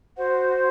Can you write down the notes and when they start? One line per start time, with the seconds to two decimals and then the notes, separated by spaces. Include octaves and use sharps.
0.16 F#4 C5 F#5